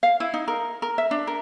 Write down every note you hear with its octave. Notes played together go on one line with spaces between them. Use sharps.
F5
E4
D#4
A#4
A#4
E5
D4
A#4